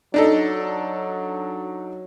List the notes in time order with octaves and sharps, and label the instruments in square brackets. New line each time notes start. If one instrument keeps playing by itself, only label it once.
[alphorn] F#3 [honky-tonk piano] D4 D#4 A4